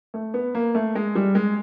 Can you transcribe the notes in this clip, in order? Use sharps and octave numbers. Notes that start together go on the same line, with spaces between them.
A3
B3
A#3
A3
G#3
G3
G#3